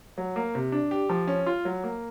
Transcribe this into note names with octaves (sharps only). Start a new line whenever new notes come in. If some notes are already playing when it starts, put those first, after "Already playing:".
F#3
A#3
C3
D4
G4
F3
C#4
F4
F#3
A#3